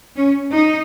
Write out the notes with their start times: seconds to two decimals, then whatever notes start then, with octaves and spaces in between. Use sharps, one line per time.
0.16 C#4
0.54 D#4